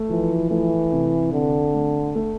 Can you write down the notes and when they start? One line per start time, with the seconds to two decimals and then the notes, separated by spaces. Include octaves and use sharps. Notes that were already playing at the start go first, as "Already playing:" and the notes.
Already playing: A3
0.10 E3 F3
0.50 E3 A3
0.92 C3
1.32 D3 C4
1.74 A3
2.15 A3